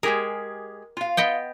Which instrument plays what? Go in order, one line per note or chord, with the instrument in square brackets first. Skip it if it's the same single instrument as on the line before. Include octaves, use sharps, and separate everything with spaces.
[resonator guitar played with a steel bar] G#3 G4 G#4 [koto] A#4
[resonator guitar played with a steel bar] F4 F5
[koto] B3 D#5 G5